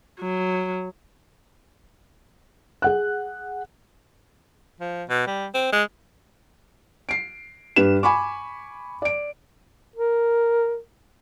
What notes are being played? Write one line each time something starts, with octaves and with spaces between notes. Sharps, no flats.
F#3
G#4 F#5 F#6
F3
B2
G3
C4
G#3
C7 D7
G2 G4 B4 E7
G#5 B5 C#6 D6
D5 D7
A#4